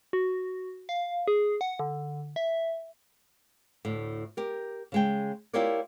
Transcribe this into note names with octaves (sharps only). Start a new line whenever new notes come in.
F#4
F5
G#4
F#5
D3
E5
D2 A2
G4 A#4
C#3 G#3 G5
E4 F4 G4 A#4 C#5 D5